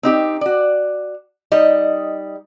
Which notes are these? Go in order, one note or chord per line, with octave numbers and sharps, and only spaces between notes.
C4 D#4 G4
F#4 D5
G3 D#4 D#5